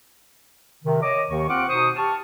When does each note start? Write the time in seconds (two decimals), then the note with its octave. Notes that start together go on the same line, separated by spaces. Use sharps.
0.84 C3 D#3
1.02 C#5 D#5 D6
1.30 D#2 D#3 C#6
1.49 C4 F4 F#5 C#6 D6
1.69 B2 D#4 C5 C#6 D#6
1.96 G4 A5 C#6 F6